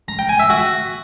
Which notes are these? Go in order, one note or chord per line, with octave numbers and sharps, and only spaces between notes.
A#5
G5
G#5
E5
F#4